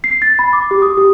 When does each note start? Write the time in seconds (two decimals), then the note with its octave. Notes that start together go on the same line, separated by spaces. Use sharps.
0.04 C7
0.22 A6
0.39 B5
0.53 D6
0.71 G4
0.82 D#6
0.98 G4